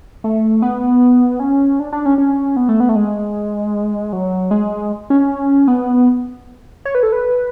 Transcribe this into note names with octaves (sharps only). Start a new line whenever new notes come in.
A3
B3
C#4
D4
D4
C#4
C#4
B3
A3
B3
A3
G#3
F#3
G#3
C#4
B3
C#5
B4
A4
B4